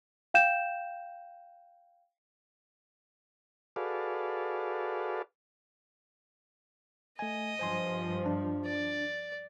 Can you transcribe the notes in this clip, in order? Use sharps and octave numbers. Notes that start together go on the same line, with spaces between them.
F5 G5 G6 E7
F#4 G#4 A4 B4 D5 F5
A3 D#5 G#5
G2 F3 C5 G#5 C6
D4
D5